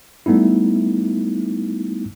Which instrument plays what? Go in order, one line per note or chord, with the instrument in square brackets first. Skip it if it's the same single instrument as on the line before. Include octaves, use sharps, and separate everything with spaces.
[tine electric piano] G3 A3 B3 D#4 E4